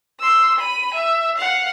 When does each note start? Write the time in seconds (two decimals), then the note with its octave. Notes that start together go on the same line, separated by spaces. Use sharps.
0.20 C6 E6
0.58 B5 D#7
0.94 E5
1.37 F5 F#5